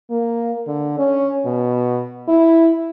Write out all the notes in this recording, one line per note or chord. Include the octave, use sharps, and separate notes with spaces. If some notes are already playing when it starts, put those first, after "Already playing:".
A#3
D3
C#4
B2
E4